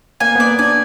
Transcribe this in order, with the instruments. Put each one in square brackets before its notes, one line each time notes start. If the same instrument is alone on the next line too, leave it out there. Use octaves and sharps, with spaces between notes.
[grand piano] A#3 [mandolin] G#5
[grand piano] B3
[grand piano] A#3 [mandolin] D5
[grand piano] D4 [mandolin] G#5